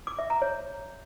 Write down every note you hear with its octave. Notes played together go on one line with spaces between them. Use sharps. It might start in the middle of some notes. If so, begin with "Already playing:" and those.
D6
E5
A#5
C#5